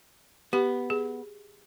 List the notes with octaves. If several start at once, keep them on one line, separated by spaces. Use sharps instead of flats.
B3 G4
G#4